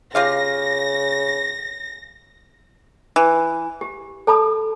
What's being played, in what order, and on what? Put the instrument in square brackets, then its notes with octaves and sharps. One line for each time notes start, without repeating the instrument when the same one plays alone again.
[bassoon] C#3 [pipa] F4 G4 F5 [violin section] A#6
[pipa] E3
[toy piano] G4
A4 A5 B5 D#6